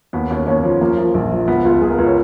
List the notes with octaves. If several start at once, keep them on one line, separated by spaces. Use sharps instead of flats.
D#2 B3
D#2 C#4
D#2 C#4
F3
F3 A#3
F3
A#1
F3
C#2 B3
C#2 F4
C#2 G#4
A#4
C#2 B4
C#5